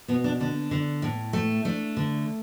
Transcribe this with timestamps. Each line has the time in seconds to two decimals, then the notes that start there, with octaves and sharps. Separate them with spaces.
0.08 B2 B3
0.24 D4
0.40 D3 D4
0.71 D3
1.02 A2
1.33 A3
1.65 A3 D4
1.97 D3